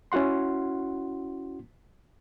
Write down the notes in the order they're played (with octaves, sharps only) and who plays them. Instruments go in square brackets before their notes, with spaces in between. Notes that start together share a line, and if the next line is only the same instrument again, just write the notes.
[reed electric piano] C#4 E4 F#4 F#5 C6